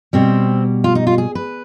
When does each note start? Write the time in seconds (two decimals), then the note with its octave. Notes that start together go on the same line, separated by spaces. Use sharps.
0.13 B2 G3 C4
0.84 F4
0.95 D#4
1.07 F4
1.18 G#4
1.35 B4